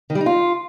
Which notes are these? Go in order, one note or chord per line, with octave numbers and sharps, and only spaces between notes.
D#3
G3
D#4
F4